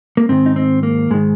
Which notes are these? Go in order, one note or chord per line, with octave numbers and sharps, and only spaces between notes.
A#3
G#2 D#3 C4
D#4
C4
A#3
G#2 D#3 G#3